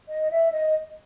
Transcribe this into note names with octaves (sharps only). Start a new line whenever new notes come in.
D#5
E5
D#5